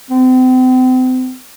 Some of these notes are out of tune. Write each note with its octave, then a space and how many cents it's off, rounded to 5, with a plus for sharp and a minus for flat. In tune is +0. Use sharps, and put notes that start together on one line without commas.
C4 -40